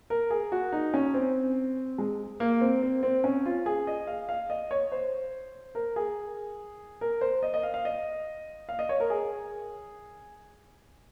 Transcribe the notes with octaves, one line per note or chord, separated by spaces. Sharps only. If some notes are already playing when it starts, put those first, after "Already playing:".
A#4
G#4
F#4
D#4
C#4
C4
G#3
A#3
C4
C4
C4
C#4
F4
G#4
D#5
F5
F5
D#5
C#5
C5
A#4
G#4
A#4
C5
D#5
D#5
F5
F5
D#5
F5
D#5
C#5
A#4
G#4